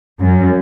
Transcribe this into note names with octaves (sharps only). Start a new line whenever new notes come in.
F#2